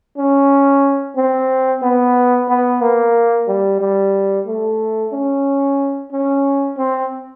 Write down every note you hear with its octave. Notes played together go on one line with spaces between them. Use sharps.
C#4
C4
B3
B3
A#3
G3
G3
A3
C#4
C#4
C4